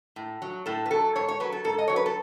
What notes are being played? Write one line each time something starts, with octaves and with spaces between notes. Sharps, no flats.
A2
F#3
A2 A4
B4
F#3 A4
G#2 C#5
C#5
F#3 B4
A4
G#2 A4
D#5
F#3 C#5
B4
A4